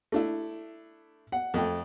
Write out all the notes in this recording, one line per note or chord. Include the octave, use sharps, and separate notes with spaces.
A3 D4 E4
F#5
F2 A3 G5